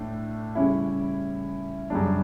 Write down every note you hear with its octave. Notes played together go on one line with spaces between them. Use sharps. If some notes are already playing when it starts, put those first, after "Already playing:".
Already playing: A2 A3 D4
C#3 G3 C#4 E4
F#2 C#3 G3 D4